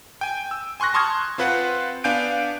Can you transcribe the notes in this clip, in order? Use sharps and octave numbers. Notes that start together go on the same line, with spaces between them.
G5 G#5
E6
G#5 C6 C#6 F#6 A#6
A5 C6 C#6 D#6 F6 G#6
C4 F4 B4 C5 F#5
B3 D4 F5 G#5 G6 D7